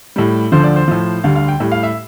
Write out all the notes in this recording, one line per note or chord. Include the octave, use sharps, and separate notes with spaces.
A2 G3
D2 D3 F3 C5
D5
C5
A2 F3
D2 D3 G3 F5
F5
G5
A2 G3
F5
E5